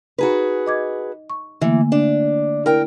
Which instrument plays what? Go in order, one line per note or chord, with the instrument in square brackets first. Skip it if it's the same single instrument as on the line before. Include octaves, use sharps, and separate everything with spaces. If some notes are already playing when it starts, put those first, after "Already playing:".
[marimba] D#4 A#5 B5 [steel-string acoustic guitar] F#4 G#4 B4
[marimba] D#5 D6 G#6
C#6
[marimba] D3 A3 A#3 [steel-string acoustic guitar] E3
[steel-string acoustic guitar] D4
[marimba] E4 [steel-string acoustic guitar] A#4 G5